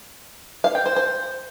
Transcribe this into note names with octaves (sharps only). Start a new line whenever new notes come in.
F5
G5
C5
C5